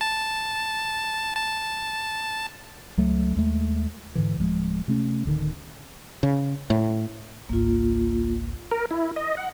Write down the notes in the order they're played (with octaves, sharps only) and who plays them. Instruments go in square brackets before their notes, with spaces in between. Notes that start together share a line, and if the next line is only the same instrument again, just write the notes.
[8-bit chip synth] A5
A5
[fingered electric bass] C#2 F#3 A3
D#2 G#3 A3
G#2 D3 E3
D1 F3 G#3
C3 A3 C#4
D1 D3 D#3
[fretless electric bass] C#3
A2
[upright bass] G#1 C#2 [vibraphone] A#3 F4
[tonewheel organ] A#4
E4
D#5
F#5